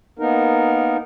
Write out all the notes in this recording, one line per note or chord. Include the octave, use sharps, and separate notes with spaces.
A#3 B3 D#4 A#4